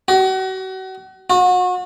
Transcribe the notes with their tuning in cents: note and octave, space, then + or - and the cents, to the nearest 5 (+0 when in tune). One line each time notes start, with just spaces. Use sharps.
F#4 +35
F#4 -35